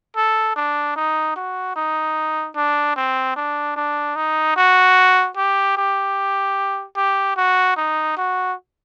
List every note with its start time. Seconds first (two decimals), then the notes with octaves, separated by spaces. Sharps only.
0.17 A4
0.56 D4
0.96 D#4
1.36 F#4
1.76 D#4
2.56 D4
2.96 C4
3.36 D4
3.77 D4
4.16 D#4
4.57 F#4
5.37 G4
5.77 G4
6.97 G4
7.37 F#4
7.77 D#4
8.18 F#4